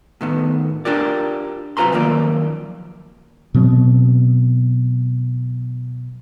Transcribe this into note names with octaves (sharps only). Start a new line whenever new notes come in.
A2 D#3 B3
D4 F4 G4 A#4 D5
F#2 C3 F4 B4 A#5 C6
F#2 D#3 F3 A#3 D5
B2 F#3 C4